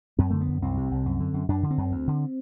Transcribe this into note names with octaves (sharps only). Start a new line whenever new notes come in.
F#2 C4
D3 A3
B3
F#2
C2 C4
C3
C2
F#2
D3
F#2
F#2 D4
D3
C4
F#2
D2
D3